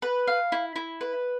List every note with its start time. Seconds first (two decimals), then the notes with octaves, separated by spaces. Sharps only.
0.02 B4
0.27 F5
0.52 E4
0.76 E4
1.01 B4